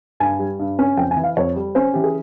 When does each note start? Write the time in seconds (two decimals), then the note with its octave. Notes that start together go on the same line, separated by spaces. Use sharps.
0.20 G2 G#5
0.39 G3
0.59 G2
0.79 C#4
0.97 F2 G5
1.11 G#5
1.17 E3
1.23 F5
1.37 F2 C#5
1.56 G3
1.75 C#4 C5
1.94 E3 G4
2.04 G#4